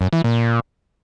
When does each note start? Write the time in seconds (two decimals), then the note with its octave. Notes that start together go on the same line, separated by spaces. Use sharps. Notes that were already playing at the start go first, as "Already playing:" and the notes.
0.01 F#2
0.13 E3
0.24 A#2